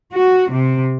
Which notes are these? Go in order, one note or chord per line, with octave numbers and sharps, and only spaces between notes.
F#4
C3